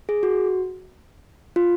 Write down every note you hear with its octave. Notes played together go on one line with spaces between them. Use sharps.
G#4
F#4
F4